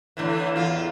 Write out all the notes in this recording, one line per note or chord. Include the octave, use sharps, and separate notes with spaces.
A2 D3 E3
E2 F4